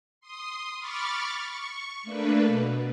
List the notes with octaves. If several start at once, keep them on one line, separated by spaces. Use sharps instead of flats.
C6 D#6
B5 C#6 D6 F6 A6
C#6
A3 A#3 D4 B4
B2